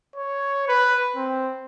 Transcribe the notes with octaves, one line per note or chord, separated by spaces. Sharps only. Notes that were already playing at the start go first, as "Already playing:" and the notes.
C#5
B4
C4